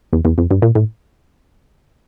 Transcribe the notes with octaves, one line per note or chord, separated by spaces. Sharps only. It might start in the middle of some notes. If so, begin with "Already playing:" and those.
E2
E2
F2
G2
A#2
A2